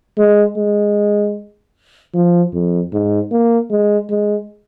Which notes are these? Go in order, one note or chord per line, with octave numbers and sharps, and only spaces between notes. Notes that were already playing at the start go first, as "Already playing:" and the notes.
G#3
G#3
F3
F2
G#2
A#3
G#3
G#3